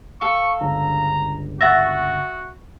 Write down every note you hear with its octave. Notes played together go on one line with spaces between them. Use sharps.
A4 F5 C#6
G1 C#2 D3 A#5
F#4 E5 F#5 C#6 A6 A#6